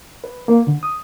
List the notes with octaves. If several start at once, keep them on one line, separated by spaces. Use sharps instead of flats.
B4
A#3
D3
D#6